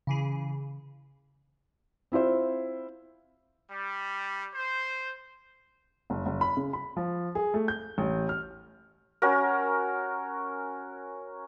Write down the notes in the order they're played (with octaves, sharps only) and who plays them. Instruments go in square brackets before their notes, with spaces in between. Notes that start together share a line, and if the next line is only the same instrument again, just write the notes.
[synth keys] C#3 E3 G#4
[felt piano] C4 E4 F4 C5
[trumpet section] G3
C5
[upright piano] F#1
F#1
B5
C#3
B5
F3
G#4
A3
G6
A1
F6
[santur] C#4 F#4 A#4